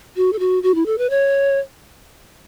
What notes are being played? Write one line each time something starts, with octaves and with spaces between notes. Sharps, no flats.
F#4
A4
F#4
F#4
E4
A4
B4
C#5